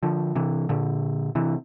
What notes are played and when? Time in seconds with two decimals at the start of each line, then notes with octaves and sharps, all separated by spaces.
0.03 D3 F3
0.35 C3 E3
0.69 A#2 D3
1.35 C3 E3